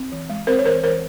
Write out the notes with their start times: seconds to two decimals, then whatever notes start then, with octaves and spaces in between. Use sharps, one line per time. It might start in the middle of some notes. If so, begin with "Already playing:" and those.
Already playing: C4
0.12 E3
0.30 G#3
0.47 C4 A#4 C5
0.59 C#5
0.65 E3 A#4 C5
0.83 E3 A#4 C5